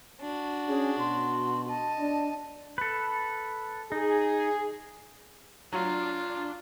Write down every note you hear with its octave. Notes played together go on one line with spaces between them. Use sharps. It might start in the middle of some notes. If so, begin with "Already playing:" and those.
D4 F#4
C#4 G#4
B2 C6
D#5 A5
D4
A4 B4
D#4 G#4
F#3 D4 F4